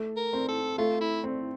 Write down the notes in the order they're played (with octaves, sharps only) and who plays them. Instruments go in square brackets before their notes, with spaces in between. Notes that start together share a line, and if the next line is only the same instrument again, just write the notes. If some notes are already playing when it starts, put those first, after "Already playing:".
Already playing: [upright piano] A3
[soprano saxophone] A#4
[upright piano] C4
[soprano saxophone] A4
[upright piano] A3 [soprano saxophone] F4
[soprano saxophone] E4
[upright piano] C4